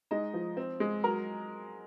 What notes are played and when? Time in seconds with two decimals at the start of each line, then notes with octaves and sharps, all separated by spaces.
0.11 G#3 D#4 D#5
0.34 F3
0.57 C4
0.80 G#3
1.03 F#3 A#4 A#5